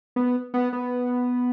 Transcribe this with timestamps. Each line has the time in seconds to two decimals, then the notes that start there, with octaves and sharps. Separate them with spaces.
0.16 B3
0.54 B3
0.73 B3